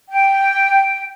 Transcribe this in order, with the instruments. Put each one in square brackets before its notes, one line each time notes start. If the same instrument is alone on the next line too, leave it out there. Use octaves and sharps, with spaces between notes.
[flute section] G5